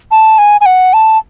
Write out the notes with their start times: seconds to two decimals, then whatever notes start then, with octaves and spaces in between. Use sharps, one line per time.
0.11 A5
0.38 G#5
0.61 G#5
0.66 F#5
0.93 A5